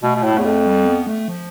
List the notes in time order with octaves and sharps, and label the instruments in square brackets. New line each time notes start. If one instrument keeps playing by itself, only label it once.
[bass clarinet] B2 [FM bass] A3
[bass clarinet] B2
A2
[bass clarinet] E2 [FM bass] A3
[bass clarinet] F2
[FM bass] G3
B3
A3
F3